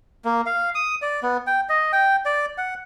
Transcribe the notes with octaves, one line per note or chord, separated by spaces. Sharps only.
A#3
F5
D#6
D5
B3
G5
D#5
G5
D5
F#5